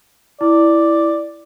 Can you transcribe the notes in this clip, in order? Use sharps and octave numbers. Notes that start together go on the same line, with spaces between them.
E4 D5